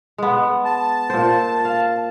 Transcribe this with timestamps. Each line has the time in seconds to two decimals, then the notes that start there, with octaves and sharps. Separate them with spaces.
0.18 G#3 B3
0.65 A5
1.10 A#2 C5
1.65 F5